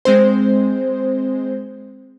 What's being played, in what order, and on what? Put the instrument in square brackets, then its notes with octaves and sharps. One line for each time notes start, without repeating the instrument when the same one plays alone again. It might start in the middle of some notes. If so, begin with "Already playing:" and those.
[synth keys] G#3 C4 C5